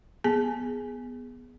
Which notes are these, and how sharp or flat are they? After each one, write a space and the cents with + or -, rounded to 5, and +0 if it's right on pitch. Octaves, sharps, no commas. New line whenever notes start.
B3 +0 G#4 -5 G#5 +0